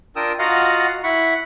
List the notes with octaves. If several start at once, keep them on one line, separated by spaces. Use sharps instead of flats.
D4 F4 A#4 G5 D#6 E6
F4 F#4 D#5 F5 F#5 A#5
E4 F#5 B5 C#6